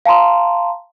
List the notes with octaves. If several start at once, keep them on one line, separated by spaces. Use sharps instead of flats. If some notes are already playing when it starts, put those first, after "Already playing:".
F5 A5 A#5 C6